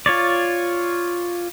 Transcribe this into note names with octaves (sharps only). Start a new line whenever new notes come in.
F4 C#5 D5